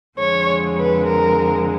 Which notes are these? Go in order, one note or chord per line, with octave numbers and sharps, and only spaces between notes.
F2 D3 F3 G#3 C#5
B4
A#4